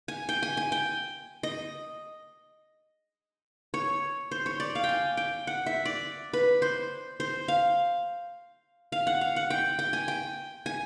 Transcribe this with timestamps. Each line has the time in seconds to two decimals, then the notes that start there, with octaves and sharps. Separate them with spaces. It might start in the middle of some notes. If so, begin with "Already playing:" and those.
0.08 G#5
0.29 G5
0.43 G#5
0.57 G#5
0.72 G5
1.43 D#5
3.74 C#5
4.31 C5
4.46 C#5
4.60 D5
4.75 F5
4.84 G5
4.89 G#5
5.17 G5
5.47 F#5
5.66 E5
5.85 D5
6.33 B4
6.62 C5
7.20 C5
7.48 F5
8.92 F5
9.07 F#5
9.21 F5
9.36 F#5
9.50 G5
9.79 G5
9.93 G#5
10.08 G5
10.66 G#5